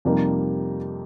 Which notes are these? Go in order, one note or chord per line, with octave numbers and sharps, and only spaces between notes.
F2 C3 G3 A#3 D#4